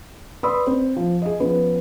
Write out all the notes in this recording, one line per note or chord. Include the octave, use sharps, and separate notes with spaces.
B4 D5 B5 C6 D#6 E6
C4
F3
G#4 D#5
F3 B3 C#4 B4